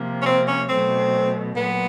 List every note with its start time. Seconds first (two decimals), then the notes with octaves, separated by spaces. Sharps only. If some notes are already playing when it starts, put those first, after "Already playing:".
Already playing: C3 F3 A#3
0.22 C#4
0.26 C4
0.47 C#4
0.69 B2 F#3 A3 C4
1.56 A#2 F#3 B3